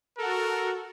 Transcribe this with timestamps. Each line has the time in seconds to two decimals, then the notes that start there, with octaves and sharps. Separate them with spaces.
0.18 F#4 A4 A#4